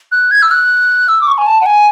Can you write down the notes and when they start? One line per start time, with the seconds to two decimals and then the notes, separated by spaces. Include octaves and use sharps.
0.12 F#6
0.31 G#6
0.42 E6
0.51 F#6
1.08 E6
1.21 D6
1.27 C#6
1.38 G#5
1.46 A5
1.61 F#5
1.66 G#5